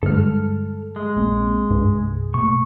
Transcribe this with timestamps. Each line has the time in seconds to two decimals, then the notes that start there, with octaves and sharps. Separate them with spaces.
0.03 G2 D3 G3 G#3 A4 F6
0.96 G#3
1.16 A#1 A#3 C4
1.71 C2 G2
2.34 B2 A3 A#3 C#6